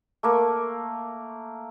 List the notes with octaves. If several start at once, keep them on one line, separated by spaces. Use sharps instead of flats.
A3 A#3